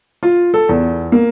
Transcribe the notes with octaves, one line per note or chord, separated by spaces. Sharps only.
F4
A4
E2
A#3